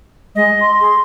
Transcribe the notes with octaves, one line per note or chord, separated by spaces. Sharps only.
G#3 D#5
C6
G#4